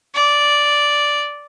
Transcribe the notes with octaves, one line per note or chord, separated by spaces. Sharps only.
D5